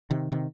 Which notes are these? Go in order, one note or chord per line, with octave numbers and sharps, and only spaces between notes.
C3 D#3
C3 D#3